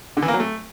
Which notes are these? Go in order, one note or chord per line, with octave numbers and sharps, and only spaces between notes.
D3
E3
A#3
F#3
A3